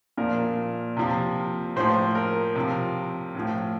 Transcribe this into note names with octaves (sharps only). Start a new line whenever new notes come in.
A#2 F3 A#4
C3 F3
A2 F3 C5
A#4
C3 F3
A2 F3